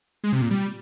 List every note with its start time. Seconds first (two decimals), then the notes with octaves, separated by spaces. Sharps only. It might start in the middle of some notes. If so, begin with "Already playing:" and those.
0.24 G#3
0.33 C3
0.42 A#2
0.51 G3